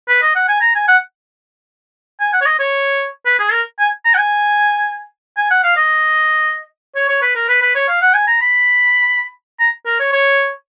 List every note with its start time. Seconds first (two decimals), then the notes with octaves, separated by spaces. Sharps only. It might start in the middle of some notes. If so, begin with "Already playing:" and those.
0.09 B4
0.22 D#5
0.35 F#5
0.48 G#5
0.61 A#5
0.75 G#5
0.88 F#5
2.20 G#5
2.33 F#5
2.41 C#5
2.46 D#5
2.59 C#5
3.26 B4
3.39 G#4
3.52 A#4
3.79 G#5
4.05 A#5
4.14 F#5
4.18 G#5
5.37 G#5
5.50 F#5
5.63 F5
5.76 D#5
6.95 C#5
7.09 C#5
7.22 B4
7.35 A#4
7.49 B4
7.62 B4
7.75 C#5
7.88 F5
8.02 F#5
8.14 G#5
8.27 A#5
8.41 B5
9.60 A#5
9.86 A#4
10.00 C#5
10.13 C#5